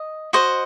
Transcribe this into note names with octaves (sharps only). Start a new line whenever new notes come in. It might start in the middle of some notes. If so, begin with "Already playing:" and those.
Already playing: D#5
F#4 C5 D#5